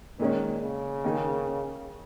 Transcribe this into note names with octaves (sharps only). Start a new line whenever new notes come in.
A#2 D#3 G#3 C#4
C#3
D#3 A#3 D#4 G#4